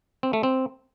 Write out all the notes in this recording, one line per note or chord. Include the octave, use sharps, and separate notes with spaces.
C4
A3
C4